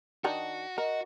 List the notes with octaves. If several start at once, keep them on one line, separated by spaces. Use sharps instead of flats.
D#3 D4 D#4 F#4
F#4 A#4 D#5